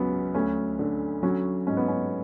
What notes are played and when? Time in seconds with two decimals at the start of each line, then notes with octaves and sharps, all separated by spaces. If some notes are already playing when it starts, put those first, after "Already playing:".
Already playing: C#2 F#3 B3 C#4
0.35 D2 C#4
0.79 D3
1.23 F#3 C#4
1.67 G#2 C#4
1.77 B3
1.88 C#4